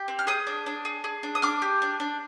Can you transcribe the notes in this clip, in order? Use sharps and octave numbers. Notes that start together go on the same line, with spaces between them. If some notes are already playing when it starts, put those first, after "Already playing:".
Already playing: G4
C4
F6
G#4 D#6 G6
D4
D4
G#4
G#4
D4
D#6
D4 D6 F6
G4
D4
D4